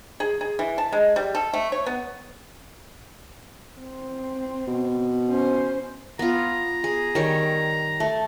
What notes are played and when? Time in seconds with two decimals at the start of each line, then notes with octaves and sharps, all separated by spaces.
0.20 G#4
0.41 G#4
0.59 E3
0.78 A5
0.92 G#3
1.16 G3
1.35 A4
1.53 A3
1.72 C#5
1.86 B3
3.79 C4
4.67 B2
5.28 C#4 C5
6.19 B3 F4 A#5
6.84 G#4
7.15 D#3 G3 C#5
8.00 A3